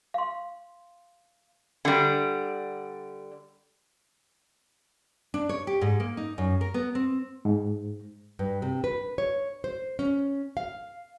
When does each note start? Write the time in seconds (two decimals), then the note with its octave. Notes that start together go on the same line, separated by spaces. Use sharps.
0.14 F5 C6
1.85 D3 G3
5.34 D4
5.49 C#5
5.67 G4
5.81 G#2
6.00 A#3
6.17 D#4
6.38 F#2
6.61 A#4
6.74 B3
6.95 C4
7.45 G#2
8.39 G2
8.62 C3
8.84 B4
9.18 C#5
9.64 C5
9.99 C#4
10.57 F5